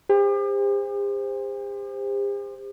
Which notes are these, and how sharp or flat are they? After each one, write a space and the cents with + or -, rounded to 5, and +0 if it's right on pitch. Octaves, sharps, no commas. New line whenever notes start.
G4 +45 C5 -5